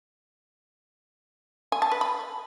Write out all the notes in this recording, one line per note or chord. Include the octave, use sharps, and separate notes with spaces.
G#5
A5
B4
B5